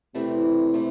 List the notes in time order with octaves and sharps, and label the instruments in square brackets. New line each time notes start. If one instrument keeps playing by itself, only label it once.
[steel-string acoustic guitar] E2 E3 A3 C4 E4 [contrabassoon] C3
[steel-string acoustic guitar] E3 A3 C4 E4